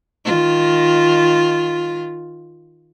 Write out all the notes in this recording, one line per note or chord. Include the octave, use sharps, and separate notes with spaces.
D#3 F4